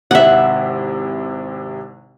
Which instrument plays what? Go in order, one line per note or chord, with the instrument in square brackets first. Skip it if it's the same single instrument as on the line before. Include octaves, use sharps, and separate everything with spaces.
[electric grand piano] G#1 C3 E4 [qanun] E5 F#5